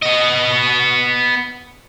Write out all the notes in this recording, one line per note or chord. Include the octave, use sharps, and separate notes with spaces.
B3 D#5